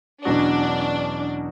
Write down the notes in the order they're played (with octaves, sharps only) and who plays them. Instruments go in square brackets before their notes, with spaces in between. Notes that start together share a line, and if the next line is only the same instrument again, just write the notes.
[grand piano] E2 B2 F#3 C#4 F#4 [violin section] D4